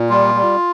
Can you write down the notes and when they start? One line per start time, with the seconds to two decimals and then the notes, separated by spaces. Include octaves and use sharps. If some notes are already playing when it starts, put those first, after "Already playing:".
Already playing: A#2
0.09 G3 F4
0.35 G3